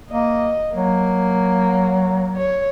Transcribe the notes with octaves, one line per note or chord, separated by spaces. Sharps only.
A#3 D#5
F#3 A#3
C#5